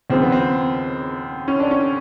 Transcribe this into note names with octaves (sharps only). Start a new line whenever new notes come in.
D#2 C#3 F3 C4
B3
C4
C#4
D4
C#4